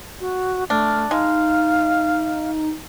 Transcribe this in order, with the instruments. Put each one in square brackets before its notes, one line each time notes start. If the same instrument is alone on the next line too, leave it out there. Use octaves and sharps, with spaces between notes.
[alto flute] F#4
[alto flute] A3 [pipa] D4 [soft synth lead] F6
[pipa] G#3 [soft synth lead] D#4 [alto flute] F5